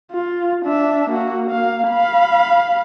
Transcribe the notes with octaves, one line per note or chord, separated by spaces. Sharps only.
F4
D4 E5
A#3 F#4
A#3 F5
F5 B5